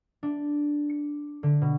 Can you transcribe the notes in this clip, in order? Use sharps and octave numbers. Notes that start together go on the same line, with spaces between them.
D4
C#7
D3
B2